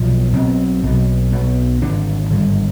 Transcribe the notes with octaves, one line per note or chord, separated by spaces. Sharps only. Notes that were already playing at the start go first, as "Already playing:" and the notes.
Already playing: B1 B2 F3
B1 B2 C4
B1 B2
B1 B2
G#1 G2 D3 D4
G#1 G2 D3